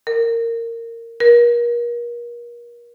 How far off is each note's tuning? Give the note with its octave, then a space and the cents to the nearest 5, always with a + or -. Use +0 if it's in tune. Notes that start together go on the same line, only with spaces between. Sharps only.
A#4 -15
A#4 +35